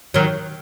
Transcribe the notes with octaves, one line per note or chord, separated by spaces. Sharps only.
D#3 F#3